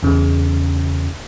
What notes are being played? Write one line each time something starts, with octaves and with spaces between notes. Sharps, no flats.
E2 C#3